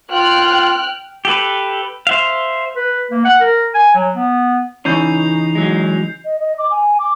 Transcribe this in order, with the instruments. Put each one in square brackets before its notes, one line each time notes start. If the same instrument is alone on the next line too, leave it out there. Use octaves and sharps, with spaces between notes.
[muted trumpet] F4 [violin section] G5 F6 F#6
[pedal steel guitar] G4 A4 B4
C5 E5 F5
[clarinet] B4
A#3
F#5
A#4
G#5
F#3
B3
[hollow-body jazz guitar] C#3 E3 C#4 [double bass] D#4 [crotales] G6 C7 F7
[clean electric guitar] F#3 G#3
[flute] D#5
D#5
D6
G#5
D6